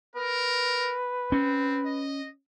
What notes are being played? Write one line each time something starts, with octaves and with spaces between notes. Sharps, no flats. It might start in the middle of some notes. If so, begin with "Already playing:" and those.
A#4 B4
C4 C#4
D#5